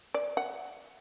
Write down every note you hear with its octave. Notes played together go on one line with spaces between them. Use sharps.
D5
F#5